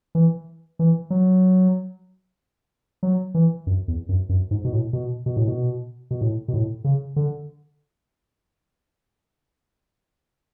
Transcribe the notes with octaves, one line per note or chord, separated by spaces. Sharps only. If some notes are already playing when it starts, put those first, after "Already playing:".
E3
E3
F#3
F#3
E3
F#2
E2
F#2
F#2
G#2
B2
A2
B2
B2
A2
B2
B2
A2
B2
A2
C#3
D3